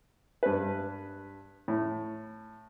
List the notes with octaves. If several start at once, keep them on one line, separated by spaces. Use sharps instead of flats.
G2 B4
A2